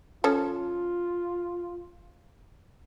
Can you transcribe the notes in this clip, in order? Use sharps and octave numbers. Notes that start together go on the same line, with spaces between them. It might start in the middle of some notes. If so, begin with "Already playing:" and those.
F3 C#4 F4 A4